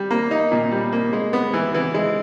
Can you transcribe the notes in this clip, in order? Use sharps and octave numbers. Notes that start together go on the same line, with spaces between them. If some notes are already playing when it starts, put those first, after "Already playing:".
Already playing: G3
A#3
D#4
A#2
G3
A#3
G#3
B3
E3
E3
G#3